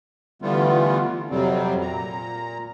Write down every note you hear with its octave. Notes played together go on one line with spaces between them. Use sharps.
D3 E3 G3 A3 B3 F4
F2 C3 F#3 G3 C4
A#2 A#5